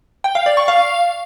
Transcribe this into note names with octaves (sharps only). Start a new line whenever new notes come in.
G5
F5
D5
C#6
F5